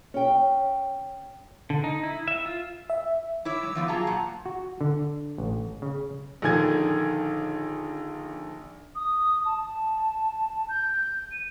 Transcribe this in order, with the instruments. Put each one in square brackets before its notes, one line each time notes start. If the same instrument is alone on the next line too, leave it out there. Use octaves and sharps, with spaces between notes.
[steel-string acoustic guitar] C#4 G5
[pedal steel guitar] D3
D#4
E4
E5
F4
[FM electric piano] E5
[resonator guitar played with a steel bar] E4 C#5 E5 [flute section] D6 E6
[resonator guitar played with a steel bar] G3
E3 F3 B3
[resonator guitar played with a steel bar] F#3 F4 G#4 [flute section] A5 A#5
[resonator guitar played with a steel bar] A#2 F#5
[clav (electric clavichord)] F#4
D3
A1
C#3
[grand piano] A#1 D3 D#3 G#5 G#6
[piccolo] D#6
A5
G6
D#7